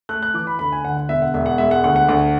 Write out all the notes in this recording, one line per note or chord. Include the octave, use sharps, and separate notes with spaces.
A3 F#6
F#6
E3 D6
B5
D2 B5
G#5
D3 F#5
F#5
E1 E5
F#5
E1 E5
F#5
G#3 E5
F#5
D2 F#5
F#5
D2 F#5